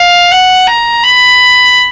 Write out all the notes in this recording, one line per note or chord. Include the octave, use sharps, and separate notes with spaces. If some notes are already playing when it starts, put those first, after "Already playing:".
Already playing: F5
F#5
A#5
B5